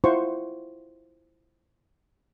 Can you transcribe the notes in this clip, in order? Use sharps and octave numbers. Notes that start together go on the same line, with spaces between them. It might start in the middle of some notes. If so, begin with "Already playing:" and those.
E4 F4 C5 F#5 C6 C#6